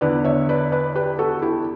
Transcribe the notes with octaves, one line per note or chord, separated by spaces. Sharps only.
E2 D3 B4 D5
C#5 E5
B4 D5
B4 D5
G4 B4
F#4 A4
E4 G4